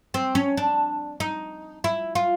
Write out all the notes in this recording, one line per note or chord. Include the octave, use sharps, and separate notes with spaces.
C4
C#4
D4
D#4
E4
F4